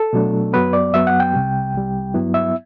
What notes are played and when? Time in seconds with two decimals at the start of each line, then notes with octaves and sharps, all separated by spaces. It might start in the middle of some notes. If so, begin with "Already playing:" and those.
Already playing: A4
0.13 B2 F#3 A3 D4
0.53 F#2 F#3 B3 B4
0.73 D5
0.93 F#2 F#3 B3 E5
1.07 F#5
1.20 G5
1.34 C2 C3 G3
1.74 C2 C3 G3
2.14 G2 F#3 B3 E4
2.34 E5